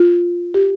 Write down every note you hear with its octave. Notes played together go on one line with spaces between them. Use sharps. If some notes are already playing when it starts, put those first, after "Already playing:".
Already playing: F4
G4